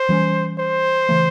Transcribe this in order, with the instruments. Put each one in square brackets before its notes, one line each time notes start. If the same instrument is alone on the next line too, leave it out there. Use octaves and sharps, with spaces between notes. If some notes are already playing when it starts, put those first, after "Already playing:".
Already playing: [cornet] C5
[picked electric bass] E3 G3 A#3 C#4
[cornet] C5
[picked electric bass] C#3 E3 A3